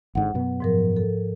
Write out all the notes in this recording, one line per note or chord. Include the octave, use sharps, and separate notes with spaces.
G#1 G#2 D3 F#5
F#2 B2 B3
G#2 F3 A#4
A4